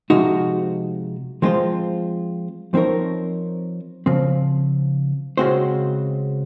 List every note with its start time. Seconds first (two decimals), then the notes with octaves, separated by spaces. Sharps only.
0.10 C3 F3 G#3 D#4 F#4
1.42 F3 G#3 C4 F4 C5
2.74 F3 C4 D#4 A#4 C#5
4.06 C#3 F3 C4
5.37 C#3 G#3 C4 F#4 C5